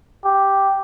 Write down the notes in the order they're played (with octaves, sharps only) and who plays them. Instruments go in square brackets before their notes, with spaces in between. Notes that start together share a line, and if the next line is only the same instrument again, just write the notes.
[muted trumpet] G4